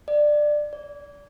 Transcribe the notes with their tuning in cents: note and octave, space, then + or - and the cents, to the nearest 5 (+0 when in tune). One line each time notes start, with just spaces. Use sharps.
D5 +15
D5 -30